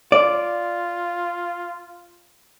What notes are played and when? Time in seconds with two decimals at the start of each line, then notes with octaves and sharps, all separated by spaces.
0.12 F4 D5